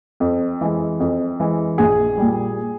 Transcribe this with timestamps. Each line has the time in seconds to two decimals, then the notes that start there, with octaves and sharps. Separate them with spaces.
0.20 F2
0.61 E3 G#3
1.00 F2
1.40 E3 G#3
1.78 A#1 G#4
2.18 A#2 G3